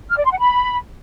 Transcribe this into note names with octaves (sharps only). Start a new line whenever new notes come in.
F6
D5
C6
F#5
B5